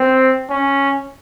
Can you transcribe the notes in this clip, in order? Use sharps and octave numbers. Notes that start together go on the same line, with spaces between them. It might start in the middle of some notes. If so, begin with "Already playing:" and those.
Already playing: C4
C#4